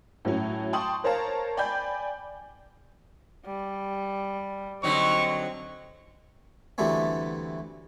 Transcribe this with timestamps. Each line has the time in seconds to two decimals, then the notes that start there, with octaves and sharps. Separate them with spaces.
0.25 A2 F#3 C#4
0.73 G5 A5 C6 C#6 D#6 F#7
1.04 A#4 C5 C#5 F5 A5 A#5
1.57 D5 G5 G#5 B5 G6
3.46 G3
4.83 D3 F#3 C4 D#4 C#6
6.78 D2 E3 G3 A3 B3 C4